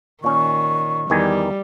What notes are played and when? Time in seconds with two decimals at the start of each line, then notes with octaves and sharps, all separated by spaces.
0.24 A#2 D#3 C#4 C#6
1.10 E2 D#3 G3 G#5